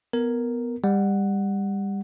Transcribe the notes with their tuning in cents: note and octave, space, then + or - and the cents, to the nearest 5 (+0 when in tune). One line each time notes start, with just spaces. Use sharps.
B3 +0 A#4 -5
G3 +25 F#5 +0